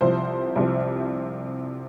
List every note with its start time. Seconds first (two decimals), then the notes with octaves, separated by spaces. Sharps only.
0.01 C2 C3 F3 C5
0.56 C2 C3 F3